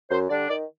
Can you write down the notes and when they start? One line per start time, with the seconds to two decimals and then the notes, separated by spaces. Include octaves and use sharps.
0.11 F#2 C5
0.29 D3 G3 D4 D5
0.48 D#3 D5